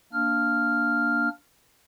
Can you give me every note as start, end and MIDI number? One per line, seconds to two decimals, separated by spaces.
0.13 1.29 58
0.13 1.29 62
0.13 1.29 89